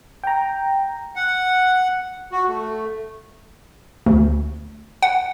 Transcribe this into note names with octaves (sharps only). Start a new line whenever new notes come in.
G5 A#5
F#5
F#4
A3
D2
F#5